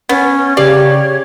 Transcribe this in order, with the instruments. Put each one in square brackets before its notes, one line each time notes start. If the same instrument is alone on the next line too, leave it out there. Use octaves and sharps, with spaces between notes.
[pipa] B3 [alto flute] C#4
[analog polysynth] C#3 G4 [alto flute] C#5 [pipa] D5 F5